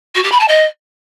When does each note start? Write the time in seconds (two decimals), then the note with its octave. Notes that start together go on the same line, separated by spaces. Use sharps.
0.15 F#4
0.23 G4
0.31 B5
0.40 A5
0.48 D#5